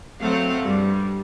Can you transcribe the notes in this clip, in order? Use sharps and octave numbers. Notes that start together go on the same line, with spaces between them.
F#3 A3 C4 F5 F#5
G2 G3